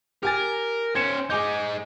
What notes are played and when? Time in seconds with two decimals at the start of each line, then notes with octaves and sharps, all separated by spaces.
0.23 G4 A#4 G#5 A6
0.95 C#4 C5 G#6 C#7 E7
1.30 G#3 D#4 G#4 D6 G6